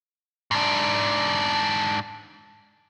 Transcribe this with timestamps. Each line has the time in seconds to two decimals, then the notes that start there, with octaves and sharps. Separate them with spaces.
0.51 G#2 D4